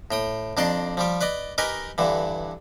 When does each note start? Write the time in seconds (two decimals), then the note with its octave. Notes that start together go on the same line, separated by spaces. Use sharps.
0.11 A2 G5 D#6
0.57 F2 D4 D#4 D5 C6
0.97 F3 G3 G4
1.21 B4 D5 D#5
1.58 D#4 G4 A#4 B4 D#5 G#5
1.98 G2 D3 E3